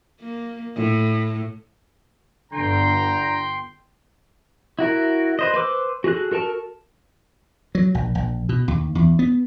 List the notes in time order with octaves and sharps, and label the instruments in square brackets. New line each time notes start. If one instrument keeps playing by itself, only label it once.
[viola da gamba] A#3
A2
[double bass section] G1 G2 [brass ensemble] D3 A#5 [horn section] G5 C6
[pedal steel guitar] E4 F#4 A#4
B4 C5 D#5
B4 C5 D6 E6
F#4 G#4 A4 F#6
F#4 A4 A#4 A5
[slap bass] F#3
A#1
A#1
B2
D#2
E2
B3